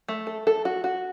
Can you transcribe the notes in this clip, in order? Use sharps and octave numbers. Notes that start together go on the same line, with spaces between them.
A3
A4
A4
F#4
F#4